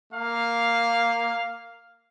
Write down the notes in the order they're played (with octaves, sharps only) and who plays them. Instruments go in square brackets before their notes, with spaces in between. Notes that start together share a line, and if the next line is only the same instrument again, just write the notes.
[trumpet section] A#3 F5